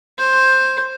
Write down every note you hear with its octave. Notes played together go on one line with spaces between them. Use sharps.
C5